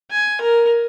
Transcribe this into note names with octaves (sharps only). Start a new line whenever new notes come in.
G#5
A#4